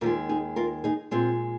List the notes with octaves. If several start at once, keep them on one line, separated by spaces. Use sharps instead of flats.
D#2 D#3 G#3 F4 A#4
D#4 G#4
F4 A#4
D#4 G#4
A#2 G#3 C4 F4